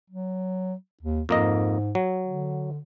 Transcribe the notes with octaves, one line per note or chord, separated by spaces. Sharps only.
F#3
D#2
F2 G#2 A#3 D#5
F#3
D3